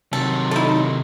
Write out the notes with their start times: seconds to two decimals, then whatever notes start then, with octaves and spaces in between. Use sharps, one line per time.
0.13 C3 D#3 F#3 A4
0.51 D3 D#4 E4 A4